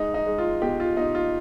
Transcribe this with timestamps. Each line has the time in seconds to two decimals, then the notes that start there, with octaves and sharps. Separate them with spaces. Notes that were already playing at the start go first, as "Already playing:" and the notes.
Already playing: G#3 D#4
0.14 D#4
0.26 G#3
0.38 F4
0.62 B2 G4
0.80 F4
0.97 B2 D#4
1.15 F4